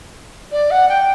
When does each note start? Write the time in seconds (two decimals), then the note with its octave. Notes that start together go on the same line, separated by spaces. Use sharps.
0.52 D5
0.71 F#5
0.89 G5